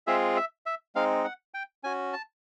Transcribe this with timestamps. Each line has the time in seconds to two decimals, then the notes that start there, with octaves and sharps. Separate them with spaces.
0.07 G#3 C4 F4 G#4 E5
0.36 E5
0.66 E5
0.95 G#3 C4 D#4 F5
1.25 F#5
1.54 G5
1.84 C#4 F#4 G#5
2.13 A5